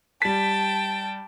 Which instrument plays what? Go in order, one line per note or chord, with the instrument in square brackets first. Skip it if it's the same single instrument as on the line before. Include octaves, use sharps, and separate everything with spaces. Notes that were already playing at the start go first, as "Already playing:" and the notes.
[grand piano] G3 B6 [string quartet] G5 A5